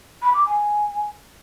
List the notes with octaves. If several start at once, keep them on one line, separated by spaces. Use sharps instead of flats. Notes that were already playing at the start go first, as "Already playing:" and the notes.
B5
D6
G#5